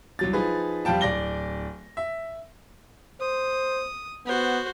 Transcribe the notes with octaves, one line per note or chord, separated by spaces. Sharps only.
C2 F#3 A6
F3 D#4 G#4 B4
F2 G3 F4 G5 A5
D1 D5 A#6 G7
E5
C5 D#6
B3 F#4 C5